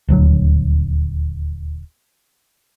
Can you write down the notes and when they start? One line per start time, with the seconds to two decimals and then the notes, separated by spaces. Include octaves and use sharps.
0.08 D#1 D2 F#3